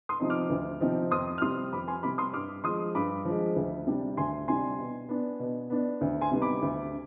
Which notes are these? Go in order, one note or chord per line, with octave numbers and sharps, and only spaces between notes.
C6 D#6
C3 F3 C4 D#4
D6 F6
D2
C3 F3 C4 D#4
F2 C6 D#6
F6
C3 G3 C6 D#6
F2 B5 D6
G#5 C6
C3 G3 B5 D6
C6 D#6
G2 D6 F6
F3 G#3 C6 D#6
G2 B5 D6
F3 G#3
D2
C3 G3 D4
D2 G#5 C6
C3 G3 D4 G#5 C6
B2
B3 D4
B2
B3 D4
D2
G#5 C6
C3 G3 B3 D#4
B5 D6
D2